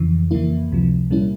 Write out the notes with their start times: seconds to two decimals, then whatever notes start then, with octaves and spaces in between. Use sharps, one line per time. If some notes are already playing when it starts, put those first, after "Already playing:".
Already playing: F2 C#3 E3
0.31 F2 C#3 E3 A#3 E4
0.71 C#2 C3 F3
1.10 A#2 G3 A#3 C#4 E4